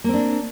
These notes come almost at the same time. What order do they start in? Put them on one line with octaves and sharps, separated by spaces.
A#3 C4 D4